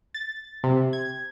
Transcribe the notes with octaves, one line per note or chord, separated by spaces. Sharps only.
A6
C3
G#6